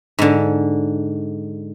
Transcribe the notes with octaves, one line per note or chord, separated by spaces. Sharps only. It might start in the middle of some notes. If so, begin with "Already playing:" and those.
G#2 D3